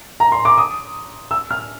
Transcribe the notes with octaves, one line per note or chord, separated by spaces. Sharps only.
A#5
C6
D6
D#6
E6
F6